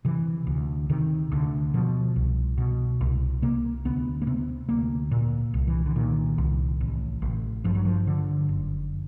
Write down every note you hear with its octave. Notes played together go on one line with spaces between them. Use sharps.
C3 E3
D2
C3 D#3
D2 D3
B2 F3
C2
B2
C2
C3 A#3
D2 B3
A#3
C3 B3
D2 A#3
A#2
C2
E3
D3
A#2 D#3
C2
A1
A1
G2 F3
F#3
F3
D3
F#1